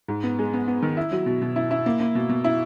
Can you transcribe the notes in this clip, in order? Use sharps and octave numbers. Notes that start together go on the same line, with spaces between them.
G#2
B3
G#3
B3
B3
D#3
E4
F#3
B2
B2
E4
E4
A#3
A#3
B2
B2
E4